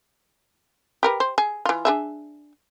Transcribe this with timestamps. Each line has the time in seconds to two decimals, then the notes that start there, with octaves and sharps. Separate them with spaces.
1.03 G4 A#4 B4
1.20 C5
1.38 G#4
1.65 E3 F4
1.85 D4 G#4 E5